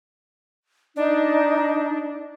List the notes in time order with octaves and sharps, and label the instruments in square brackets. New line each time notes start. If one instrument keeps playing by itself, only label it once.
[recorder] D4 [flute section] D#4